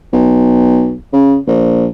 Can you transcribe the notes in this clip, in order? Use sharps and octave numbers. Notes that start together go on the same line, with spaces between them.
B1
C#3
A#1